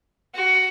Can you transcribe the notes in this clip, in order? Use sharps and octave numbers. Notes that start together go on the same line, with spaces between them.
F#4